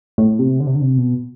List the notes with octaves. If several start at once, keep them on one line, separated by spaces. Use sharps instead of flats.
A2
C3
D3
C3
D3
C3
B2